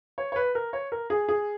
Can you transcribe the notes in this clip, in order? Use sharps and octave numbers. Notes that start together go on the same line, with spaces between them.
C#5
C#5
B4
A#4
C#5
A#4
G#4
G#4